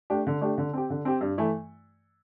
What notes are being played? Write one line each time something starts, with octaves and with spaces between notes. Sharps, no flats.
A3 D4 G4
D3
A3 D4 G4
D3
C4 G4
D3
C4 G4
G2
E3 A3 E4